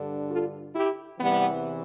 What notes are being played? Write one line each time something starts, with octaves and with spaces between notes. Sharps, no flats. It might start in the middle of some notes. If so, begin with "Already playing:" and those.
Already playing: G2 D3
F4 A4
E4 G4
E2 C3 E3 G3 B3